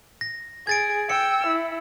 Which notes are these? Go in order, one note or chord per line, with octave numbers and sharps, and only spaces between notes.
A#6
G#4 G#6 A6 D7
G5 E6 C#7
E4